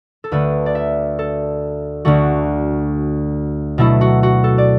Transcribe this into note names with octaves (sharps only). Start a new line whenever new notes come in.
A4
D2 D3 A3 B4
D5
E5
A4
D2 D3 A3 F#4
B2 F#3 A3 E4
F#4
F#4
A4
D5